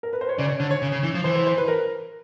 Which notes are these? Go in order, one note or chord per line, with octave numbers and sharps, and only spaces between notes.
A#4
B4
C5
C#5
C#3 D5
C#5
D3
C#5
C#3
C#3
E3
F3
E3 C5
C5
C5
B4
A#4